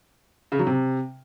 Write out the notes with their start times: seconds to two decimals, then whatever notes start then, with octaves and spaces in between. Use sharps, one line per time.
0.52 C#3
0.59 F#3
0.67 C3